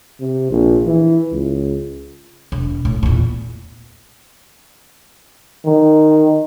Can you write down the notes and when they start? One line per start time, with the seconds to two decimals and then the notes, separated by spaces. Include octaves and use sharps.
0.20 C3
0.51 A#1
0.87 E3
1.33 C#2
2.52 E1
2.85 A2
3.03 E2 A#2
5.65 D#3